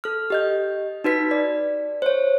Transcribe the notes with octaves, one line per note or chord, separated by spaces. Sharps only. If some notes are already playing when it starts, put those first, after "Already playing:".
A4 F6
G4 D#5 G6
D#4 F#4 B4 B6
D5
C5 C#5